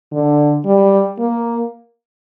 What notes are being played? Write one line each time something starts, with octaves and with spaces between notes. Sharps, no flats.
D3
G3
A#3